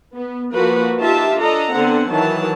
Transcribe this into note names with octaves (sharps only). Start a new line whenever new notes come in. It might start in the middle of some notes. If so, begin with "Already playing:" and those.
B3
F3 A#3 F#4 B4
D#4 F4 G4 E5 A5
D4 A4 D#5 A#5
D3 B3 C4 F#5
D#3 E3 F#3 A5